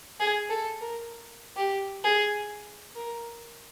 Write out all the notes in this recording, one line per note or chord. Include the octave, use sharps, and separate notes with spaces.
G#4
A4
A#4
G4
G#4
A#4